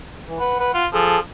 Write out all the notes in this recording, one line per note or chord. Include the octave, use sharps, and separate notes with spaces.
E3
B4 F#5
B4
F4
F3 G#4 A4 A5